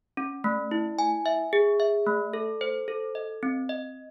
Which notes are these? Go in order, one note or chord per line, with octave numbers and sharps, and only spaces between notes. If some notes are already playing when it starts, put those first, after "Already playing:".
C#4
A3
E4
G#5
E5
G#4
E5
A3
A4
C5
A4
D#5
C4
D#5